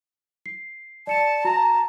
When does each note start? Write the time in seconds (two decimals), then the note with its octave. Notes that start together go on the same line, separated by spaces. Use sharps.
0.46 C7
1.07 D5 A5 C#7 E7
1.45 F#4 A#5